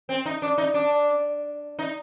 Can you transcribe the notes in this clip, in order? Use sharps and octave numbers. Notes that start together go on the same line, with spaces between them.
C4
D#4
D4
D#4
D4
D#4